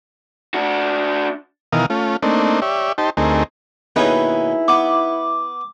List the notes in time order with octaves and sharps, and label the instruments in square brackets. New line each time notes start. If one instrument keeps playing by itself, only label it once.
[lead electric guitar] D4 F#4
[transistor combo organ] B2 D#3 E3 A#4 F5 D#6
A3 C#4 F4
A3 A#3 C4 D4 D#4
G4 C#5 D5 E5
D#4 G4 C5 A5
D2 A3 C4 D#4 G#4 A#4
[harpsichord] D#2 B2 C#4 [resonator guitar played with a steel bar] D#4 G#4 B4 [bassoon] E4
[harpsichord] B3 [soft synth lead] D6